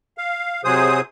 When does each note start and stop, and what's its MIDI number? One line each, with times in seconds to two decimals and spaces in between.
0.18 0.61 77
0.64 1.01 48
0.64 1.01 54
0.64 1.01 68
0.64 1.01 72
0.64 1.01 87